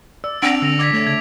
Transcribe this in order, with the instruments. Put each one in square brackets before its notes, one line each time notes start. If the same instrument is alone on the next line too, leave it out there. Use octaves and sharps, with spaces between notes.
[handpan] D5 [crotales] E6
[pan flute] C4 [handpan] D4 [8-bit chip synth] F#5 [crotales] D7 F7
[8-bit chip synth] D3 [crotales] E6 A#6 F7
[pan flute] D5 [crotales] D6 G#6 B6
[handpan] A3 [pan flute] C#5
[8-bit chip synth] C#3 [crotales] G#6